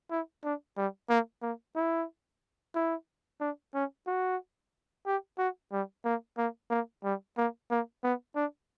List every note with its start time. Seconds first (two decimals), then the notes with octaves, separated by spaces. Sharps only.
0.10 E4
0.44 D4
0.77 G3
1.09 A#3
1.42 A#3
1.75 E4
2.75 E4
3.40 D4
3.74 C#4
4.07 F#4
5.06 G4
5.38 F#4
5.71 G3
6.05 A#3
6.38 A#3
6.70 A#3
7.04 G3
7.37 A#3
7.70 A#3
8.03 B3
8.35 D4